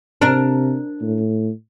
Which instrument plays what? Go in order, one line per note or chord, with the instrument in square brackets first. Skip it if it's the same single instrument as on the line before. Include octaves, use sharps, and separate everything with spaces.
[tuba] C3 [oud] D4 A#4
[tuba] A2